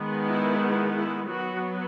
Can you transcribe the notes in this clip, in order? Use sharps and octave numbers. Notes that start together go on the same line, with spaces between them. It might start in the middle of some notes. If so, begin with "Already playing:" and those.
Already playing: D#3 G#3 B3
E4
E4
F#3 B3 F#4